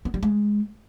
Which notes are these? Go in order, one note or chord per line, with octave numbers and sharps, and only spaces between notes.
B3
G3
G#3